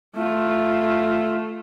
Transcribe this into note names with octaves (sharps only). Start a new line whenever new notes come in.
A3 F4